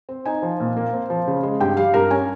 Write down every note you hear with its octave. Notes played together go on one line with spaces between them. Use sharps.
C4
D#4 G#5
F3
A#2
A#3
C4
F3
C#3
G#3
G2 G5
G3 F5
G2 A#4
C#4 G#5